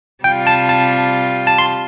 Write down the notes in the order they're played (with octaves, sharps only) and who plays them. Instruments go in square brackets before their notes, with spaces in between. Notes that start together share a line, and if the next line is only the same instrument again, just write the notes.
[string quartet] C3 G3 F4 [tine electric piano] G5
[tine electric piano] A5
A5
A5
C6